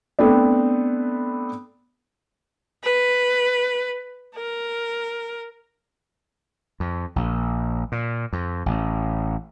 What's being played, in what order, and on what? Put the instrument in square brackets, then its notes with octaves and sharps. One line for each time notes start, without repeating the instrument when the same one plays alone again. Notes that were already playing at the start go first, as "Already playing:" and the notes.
[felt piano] A3 B3 C4 D4
[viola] B4
A#4
[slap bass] F2
A#1
A#2
F2
A1